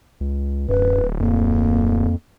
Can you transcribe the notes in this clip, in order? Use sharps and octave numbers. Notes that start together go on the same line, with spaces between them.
C#2
D1 F#2 B4
F2 A#3